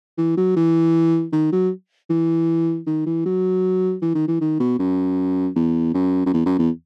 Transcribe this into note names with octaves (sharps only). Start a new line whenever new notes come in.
E3
F#3
E3
D#3
F#3
E3
D#3
E3
F#3
E3
D#3
E3
D#3
B2
F#2
E2
F#2
F#2
E2
F#2
E2